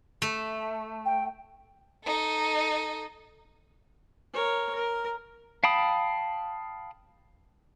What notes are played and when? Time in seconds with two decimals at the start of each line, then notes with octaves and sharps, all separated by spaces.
0.22 A3
1.05 G5
2.04 D#4 A4
4.34 A#4 C#5
4.74 A#4
5.64 F5 G5 A5 B5 D#6